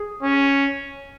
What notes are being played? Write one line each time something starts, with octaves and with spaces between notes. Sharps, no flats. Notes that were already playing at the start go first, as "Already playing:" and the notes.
Already playing: G#4
C#4